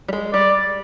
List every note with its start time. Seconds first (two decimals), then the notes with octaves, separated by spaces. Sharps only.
0.08 G3
0.13 G#3
0.33 G3 D5